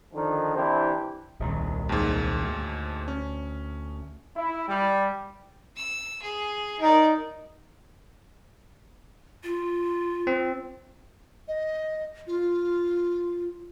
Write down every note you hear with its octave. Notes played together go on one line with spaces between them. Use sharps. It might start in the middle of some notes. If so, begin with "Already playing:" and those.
D3 D#3 F3
C3 E3 D4 E4 G4 C5
D#1 C2 D#3
D#2 G#2
D2
C#4
E4
G3
E6
G#4
D#4 A#4 D5
F4
C4
D#5
F4